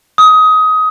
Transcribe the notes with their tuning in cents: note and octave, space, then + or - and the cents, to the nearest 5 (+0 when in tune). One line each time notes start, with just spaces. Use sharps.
D#6 +20